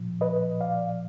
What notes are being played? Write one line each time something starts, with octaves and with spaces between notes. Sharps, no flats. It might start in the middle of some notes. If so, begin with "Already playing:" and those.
Already playing: A#2 F3
B4 D#5
D5 F5